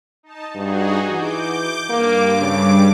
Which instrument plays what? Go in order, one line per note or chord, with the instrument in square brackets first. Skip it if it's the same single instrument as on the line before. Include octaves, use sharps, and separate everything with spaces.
[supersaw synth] D#4 A5
[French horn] G2 [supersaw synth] D#4 F#4 G#4
[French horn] E3 [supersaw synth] D6 G6
[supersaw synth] G2 D6 [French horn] A#3
[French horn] C#3